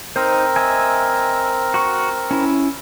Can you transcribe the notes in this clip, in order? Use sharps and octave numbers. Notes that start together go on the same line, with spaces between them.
C4 D#4 A#4 C5
D#5 E5 G#5
F#4 C#6
C#4 E4